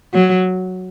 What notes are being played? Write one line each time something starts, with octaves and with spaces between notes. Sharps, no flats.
F#3